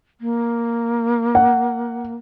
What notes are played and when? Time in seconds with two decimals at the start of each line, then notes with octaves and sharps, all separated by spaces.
0.21 A#3
1.35 F#5